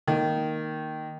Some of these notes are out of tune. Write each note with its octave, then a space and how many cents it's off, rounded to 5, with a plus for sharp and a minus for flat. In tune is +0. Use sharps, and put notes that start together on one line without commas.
D#3 +0 A#3 +0